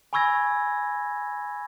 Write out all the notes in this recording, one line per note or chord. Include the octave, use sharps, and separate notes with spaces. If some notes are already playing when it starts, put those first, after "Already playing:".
G#5 B5 C#6 E6 G#6 A#6